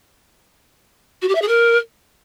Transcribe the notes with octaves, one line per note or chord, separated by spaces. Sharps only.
F#4
G4
E5
G#4
A#4